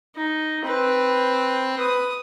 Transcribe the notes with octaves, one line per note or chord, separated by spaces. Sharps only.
D#4
C4 B4
B4 D#6